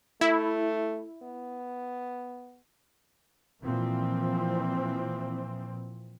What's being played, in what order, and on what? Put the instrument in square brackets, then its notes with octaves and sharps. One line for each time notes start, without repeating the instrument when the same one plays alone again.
[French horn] A3 [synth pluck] E4
[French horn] B3
[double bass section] A#2 E3 F3 C4